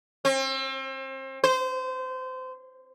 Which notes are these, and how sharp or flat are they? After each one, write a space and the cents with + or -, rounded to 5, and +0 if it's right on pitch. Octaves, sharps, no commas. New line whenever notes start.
C4 +35
C5 -25